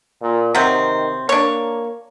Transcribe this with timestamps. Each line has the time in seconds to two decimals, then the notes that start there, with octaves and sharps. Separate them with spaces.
0.22 A#2
0.55 C3 D#3 F#3 C4
1.29 A#3 D4 C#5